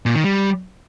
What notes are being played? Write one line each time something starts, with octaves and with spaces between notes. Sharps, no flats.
A#2
D#3
G3